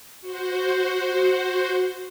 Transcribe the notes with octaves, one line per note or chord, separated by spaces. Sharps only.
F#4 C5